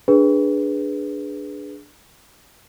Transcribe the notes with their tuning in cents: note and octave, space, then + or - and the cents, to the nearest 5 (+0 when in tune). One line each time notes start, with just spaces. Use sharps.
D4 +0 G#4 +0 B4 +0